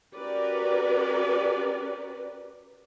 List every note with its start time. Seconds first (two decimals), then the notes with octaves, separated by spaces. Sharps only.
0.15 C#4 F#4 G4 A#4 B4 D5